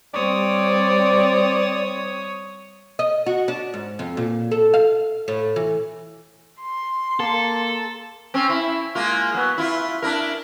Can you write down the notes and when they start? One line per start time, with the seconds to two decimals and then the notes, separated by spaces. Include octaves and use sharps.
0.14 G3 C4 C#5 D5 D#6
2.99 D#5
3.26 F#4
3.48 D4
3.74 G#2
3.99 F2
4.17 A#2
4.51 A4
4.74 F5
5.28 A2
5.56 E3
6.61 C6
7.20 A#3 A4
8.34 C4 C#4
8.49 E4
8.95 G#3 A#3 F4
9.34 F#3 B3
9.58 E4 F4
10.02 D4 E4 A#4